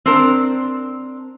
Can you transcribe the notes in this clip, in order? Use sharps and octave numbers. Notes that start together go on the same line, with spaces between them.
C4 D4 A#4